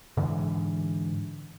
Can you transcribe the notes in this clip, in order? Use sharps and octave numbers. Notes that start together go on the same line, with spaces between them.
G#2 D3 E3